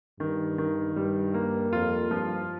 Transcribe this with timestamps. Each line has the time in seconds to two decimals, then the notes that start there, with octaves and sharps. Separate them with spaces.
0.20 G2 D#3
0.58 D#3
0.96 G2 G3
1.34 A#3
1.72 F2 F4
2.11 G2 F3